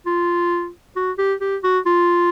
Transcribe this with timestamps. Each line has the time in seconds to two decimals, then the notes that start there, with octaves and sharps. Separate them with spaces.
0.06 F4
0.96 F#4
1.18 G4
1.41 G4
1.63 F#4
1.86 F4